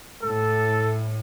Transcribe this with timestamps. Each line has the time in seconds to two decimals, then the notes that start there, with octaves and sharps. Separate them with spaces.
0.23 A2 A4